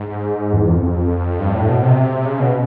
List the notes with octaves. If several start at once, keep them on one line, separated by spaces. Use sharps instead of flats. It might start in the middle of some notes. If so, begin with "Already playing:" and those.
Already playing: G#2
E2
F2
F2
G2
A2
B2
C3
C#3
B2